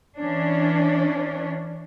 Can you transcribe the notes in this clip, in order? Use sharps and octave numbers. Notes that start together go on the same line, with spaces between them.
E3 C#4 D4